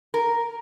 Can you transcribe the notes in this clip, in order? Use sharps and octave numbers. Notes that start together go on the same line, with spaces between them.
A#4